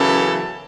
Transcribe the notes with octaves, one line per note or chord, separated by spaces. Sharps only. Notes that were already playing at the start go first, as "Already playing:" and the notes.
Already playing: F#2 C#3 E3 B3 A4